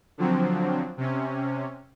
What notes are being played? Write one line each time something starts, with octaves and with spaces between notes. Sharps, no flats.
D3 F3 F#3 C4
C3 C#4